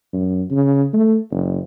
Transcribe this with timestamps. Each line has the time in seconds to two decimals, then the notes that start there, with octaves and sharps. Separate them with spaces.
0.13 F#2
0.51 C#3
0.93 A3
1.31 F#1